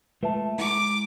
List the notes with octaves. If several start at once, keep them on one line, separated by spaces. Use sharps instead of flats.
G#3 A3 F4 B4 E5 A5
G#3 E4 F#5 A#5 D6